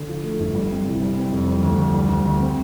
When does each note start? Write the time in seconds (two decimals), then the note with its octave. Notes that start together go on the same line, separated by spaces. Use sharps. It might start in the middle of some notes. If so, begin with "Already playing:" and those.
Already playing: D3
0.09 F3
0.24 A3
0.40 G1
0.55 G3
0.71 C4
0.86 C2
1.02 G3
1.17 C4
1.32 F2
1.48 G3
1.63 D2
1.79 D2
1.94 G3
2.09 D2
2.26 D2
2.40 C4